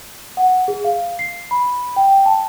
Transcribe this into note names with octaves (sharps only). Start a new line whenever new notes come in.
F#5
G#4
F5
C7
B5
G5
A5